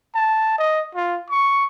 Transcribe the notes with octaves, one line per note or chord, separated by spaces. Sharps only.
A5
D#5
F4
C#6